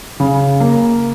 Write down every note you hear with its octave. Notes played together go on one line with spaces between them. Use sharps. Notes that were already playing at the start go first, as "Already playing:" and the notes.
C#3
A#3